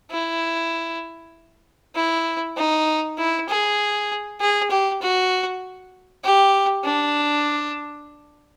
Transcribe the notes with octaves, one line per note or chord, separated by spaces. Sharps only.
E4
E4
D#4
E4
G#4
G#4
G4
F#4
G4
D4